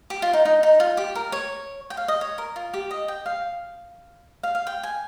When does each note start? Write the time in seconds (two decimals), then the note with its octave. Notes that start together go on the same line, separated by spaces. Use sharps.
0.10 G4
0.22 F4
0.33 D#4
0.45 D#4
0.63 D#4
0.80 F4
0.97 G4
1.15 A#4
1.32 C#5
1.90 G5
1.97 F5
2.08 D#5
2.21 C#5
2.38 A#4
2.56 F4
2.74 G4
2.91 D#5
3.08 G5
3.26 F5
4.43 F5
4.55 F5
4.67 G5
4.83 G#5